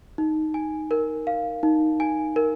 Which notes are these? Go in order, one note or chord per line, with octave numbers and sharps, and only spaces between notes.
D#4
G#5
A#4
F5
D#4
G#5
A#4